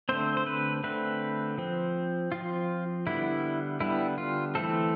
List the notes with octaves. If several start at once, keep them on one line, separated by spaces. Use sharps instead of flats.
D3 A3 C4 C5
C5
B4
D3 A3 C4 B4
F3 C4
F3 C4 F4
D3 G3 B3 E4
D3 G3 B3 E4
F4
E3 A3 C4 A4